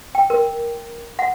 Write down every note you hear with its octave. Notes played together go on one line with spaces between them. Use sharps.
G5
A#4
F#5